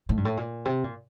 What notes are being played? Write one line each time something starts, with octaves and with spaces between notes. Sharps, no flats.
A2
G2
A2
A#2
C3
A#2